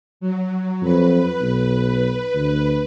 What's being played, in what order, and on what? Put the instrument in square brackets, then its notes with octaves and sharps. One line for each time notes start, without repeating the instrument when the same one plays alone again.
[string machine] F#3
[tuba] F2 [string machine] B4
[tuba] B1
D2